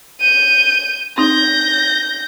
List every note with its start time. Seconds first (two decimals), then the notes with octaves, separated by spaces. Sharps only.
0.20 G6 D#7
1.18 C4 D#4 G6 A#6